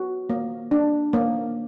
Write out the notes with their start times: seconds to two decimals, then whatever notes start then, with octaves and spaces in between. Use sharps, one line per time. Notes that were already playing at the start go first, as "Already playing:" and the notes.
Already playing: F#4
0.30 A#3
0.71 D4
1.13 A#3